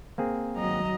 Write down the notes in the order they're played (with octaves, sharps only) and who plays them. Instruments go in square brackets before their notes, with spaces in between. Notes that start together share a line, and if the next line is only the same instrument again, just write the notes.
[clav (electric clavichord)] A#3 C4 G#4
[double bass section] G#1 F#3 [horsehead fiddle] D#5 A#5